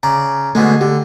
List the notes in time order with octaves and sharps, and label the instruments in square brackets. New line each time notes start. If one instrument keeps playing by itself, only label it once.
[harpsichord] C#3 D5 [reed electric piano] A#5
[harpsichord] B2 D3 G#3 [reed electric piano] A3
[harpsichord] D3 [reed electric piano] G4